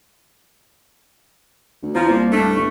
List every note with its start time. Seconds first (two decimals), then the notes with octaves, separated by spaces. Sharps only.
1.82 D2
1.95 E2 F3 A#5
2.09 C2 A#3
2.32 G2 A3 D4
2.56 G1 C#6